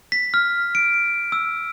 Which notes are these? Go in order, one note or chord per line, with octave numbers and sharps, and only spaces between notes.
B6
F6
D7
E6